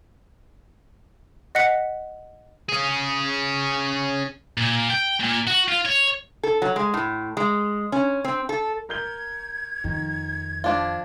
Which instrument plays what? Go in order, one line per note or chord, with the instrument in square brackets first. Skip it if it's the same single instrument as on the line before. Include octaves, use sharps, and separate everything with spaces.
[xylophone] D#5 F#5 F#6 B6 C#7
[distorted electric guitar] C#4 G#4
A#2
G5
A#2
F#4
F4
C#5
[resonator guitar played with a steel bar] A4
F#3
G#3
A2
G#3
C#4
C4
A4
[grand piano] A#4 G6 G7 [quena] G#6
[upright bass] F2 [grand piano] D#3
[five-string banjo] F3 D4 F4